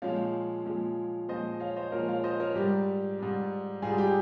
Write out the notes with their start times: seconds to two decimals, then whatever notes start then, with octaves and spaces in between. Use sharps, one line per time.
0.02 A#2 F3 G#3 C#5 F5
0.65 A#2 F3 G#3
1.29 A#2 F3 G#3 C5 D#5
1.60 C#5 F5
1.76 C5 D#5
1.92 A#2 F3 G#3 A#4 C#5
2.08 C#5 F5
2.24 C5 D#5
2.40 A#4 C#5
2.55 G#2 G3 G4
3.19 G#2 G3
3.82 G#2 G3 F4 G#4
3.98 G4